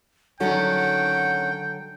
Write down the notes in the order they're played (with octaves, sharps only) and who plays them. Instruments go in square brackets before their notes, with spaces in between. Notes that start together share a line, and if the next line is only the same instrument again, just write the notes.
[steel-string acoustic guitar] D3 F#3 A4 [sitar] D#3 C#4 [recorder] F#5 [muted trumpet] G5